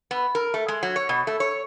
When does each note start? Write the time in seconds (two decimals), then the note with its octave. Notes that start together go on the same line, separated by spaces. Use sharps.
0.11 B3
0.35 A#4
0.54 A3
0.68 G#3
0.83 F#3
0.96 C#5
1.09 B2
1.27 A3
1.40 C#5